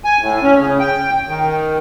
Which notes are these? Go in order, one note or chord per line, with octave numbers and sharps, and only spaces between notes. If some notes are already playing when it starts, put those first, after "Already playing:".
G#5
A2
C#4
C#3
G5
D#3